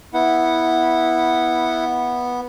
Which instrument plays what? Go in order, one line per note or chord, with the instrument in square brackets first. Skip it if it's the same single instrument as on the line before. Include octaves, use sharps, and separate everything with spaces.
[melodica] B3 [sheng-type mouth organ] E4 F#5